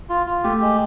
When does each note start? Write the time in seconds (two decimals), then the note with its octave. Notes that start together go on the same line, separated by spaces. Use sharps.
0.09 F4
0.27 F4
0.44 A3 G4
0.61 G#3